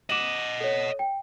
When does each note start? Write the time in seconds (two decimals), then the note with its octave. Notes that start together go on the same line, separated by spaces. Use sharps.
0.10 D#5 F#5 D6 E7 F#7
0.61 A4 C#5
0.99 G5